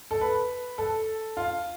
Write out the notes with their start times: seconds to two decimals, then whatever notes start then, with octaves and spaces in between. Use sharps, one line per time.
0.11 A4
0.21 B4
0.78 A4
1.37 F4